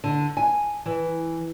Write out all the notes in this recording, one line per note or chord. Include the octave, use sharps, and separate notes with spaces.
D3
G#5
E3